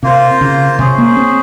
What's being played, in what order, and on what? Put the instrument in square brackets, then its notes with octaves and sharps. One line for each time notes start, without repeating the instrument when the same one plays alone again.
[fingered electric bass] C3 [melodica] A#3 F4 C5
[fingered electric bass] C#3
[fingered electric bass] C3 [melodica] C#4 G#4 C5
[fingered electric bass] A#3
C4